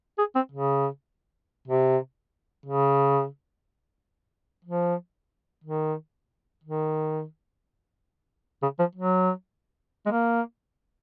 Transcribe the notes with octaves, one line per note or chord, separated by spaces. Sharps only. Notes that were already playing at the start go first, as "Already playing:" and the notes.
G#4
C4
C#3
C3
C#3
F3
D#3
D#3
C#3
F3
F#3
G#3
A#3